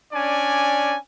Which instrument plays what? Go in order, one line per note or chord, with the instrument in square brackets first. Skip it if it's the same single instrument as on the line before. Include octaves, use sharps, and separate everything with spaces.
[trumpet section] C#4 D4 D5 G#5